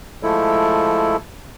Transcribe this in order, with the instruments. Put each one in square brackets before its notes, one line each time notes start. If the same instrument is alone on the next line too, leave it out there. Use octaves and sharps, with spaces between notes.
[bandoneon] F3 G#3 A3 E4 A4